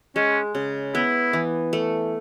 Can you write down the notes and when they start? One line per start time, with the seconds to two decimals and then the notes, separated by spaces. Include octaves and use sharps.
0.16 G#3 C#4
0.55 C#3
0.94 B3 E4
1.33 E3
1.73 A3